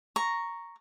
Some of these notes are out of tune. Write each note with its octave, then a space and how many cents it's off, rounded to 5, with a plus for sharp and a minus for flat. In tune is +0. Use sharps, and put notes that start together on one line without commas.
A#5 +0 C#6 +0